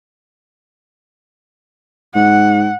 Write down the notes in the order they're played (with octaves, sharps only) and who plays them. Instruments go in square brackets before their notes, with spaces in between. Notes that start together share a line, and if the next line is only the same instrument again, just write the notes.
[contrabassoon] G#2 [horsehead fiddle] F#5